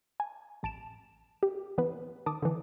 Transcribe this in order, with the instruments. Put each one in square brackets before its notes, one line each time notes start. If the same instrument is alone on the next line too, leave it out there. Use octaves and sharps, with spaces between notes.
[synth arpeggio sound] G#5
A1 A5 D7 E7
G4
E3 B3 B4
D#3 A5 D6 D#6
D3 E3